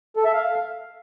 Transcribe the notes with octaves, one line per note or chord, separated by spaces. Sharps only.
A4
E5
F5